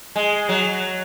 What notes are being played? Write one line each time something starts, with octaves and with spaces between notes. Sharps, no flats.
G#3
F#3